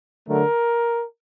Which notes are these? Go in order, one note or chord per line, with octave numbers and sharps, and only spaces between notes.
D3 F#3 A3 A#4